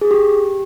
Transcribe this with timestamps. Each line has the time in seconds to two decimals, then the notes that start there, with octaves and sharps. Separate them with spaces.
0.01 G#4
0.11 G4